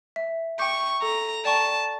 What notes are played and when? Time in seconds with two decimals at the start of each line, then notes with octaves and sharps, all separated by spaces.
0.16 E5
0.59 G5 C#6 D6 G6
1.02 A4 A#5
1.45 D5 G5 A5 A#5 C#6